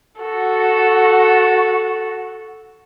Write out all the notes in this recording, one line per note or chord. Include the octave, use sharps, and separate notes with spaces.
F#4 A4